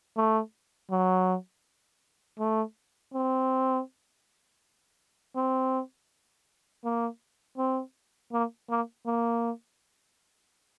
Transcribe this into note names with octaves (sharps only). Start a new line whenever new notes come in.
A3
F#3
A3
C4
C4
A#3
C4
A#3
A#3
A#3